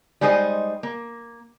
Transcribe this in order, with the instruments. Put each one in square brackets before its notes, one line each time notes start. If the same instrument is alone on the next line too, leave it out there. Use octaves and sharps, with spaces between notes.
[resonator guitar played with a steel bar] G3 G#3 D#4 C5 D5 D#5
A#3